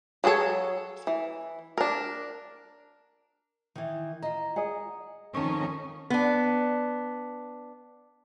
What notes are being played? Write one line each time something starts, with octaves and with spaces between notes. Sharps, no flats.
F#3 F#4 G#4 A4 C#5
E3
D4 A#4
D#3 E3
F4 D#5 A#5
G#4 D#5 F#5
F2 D#3 C#4 A5 C#6
B3 D4